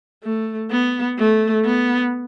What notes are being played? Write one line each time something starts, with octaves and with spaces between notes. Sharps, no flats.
A3
B3
A3
B3